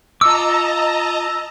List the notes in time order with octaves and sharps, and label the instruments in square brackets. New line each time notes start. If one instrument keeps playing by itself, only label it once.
[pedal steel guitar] F4 C#6 D6 [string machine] D#5 A5 A#5 [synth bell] E6